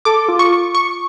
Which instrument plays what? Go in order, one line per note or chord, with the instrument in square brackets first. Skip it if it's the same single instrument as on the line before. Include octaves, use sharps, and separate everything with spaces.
[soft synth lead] A4 [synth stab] D6
[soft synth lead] F4
[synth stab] C#6
C#6